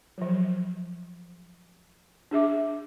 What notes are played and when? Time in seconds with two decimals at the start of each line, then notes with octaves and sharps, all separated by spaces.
0.18 F3 F#3
2.31 D4 G#4 E5 D6